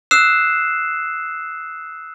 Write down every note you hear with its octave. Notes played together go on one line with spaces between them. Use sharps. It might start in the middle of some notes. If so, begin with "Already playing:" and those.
D#6 E6 F#6 C7 E7